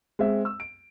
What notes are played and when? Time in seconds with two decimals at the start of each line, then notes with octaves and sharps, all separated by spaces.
0.19 G#3 C4 E5
0.45 E6
0.60 D7